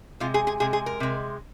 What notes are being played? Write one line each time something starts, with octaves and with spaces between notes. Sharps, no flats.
C3 G#3 F4
G#4
G#4
C3 G#3 G#4
G#4
A#4
C3 G#3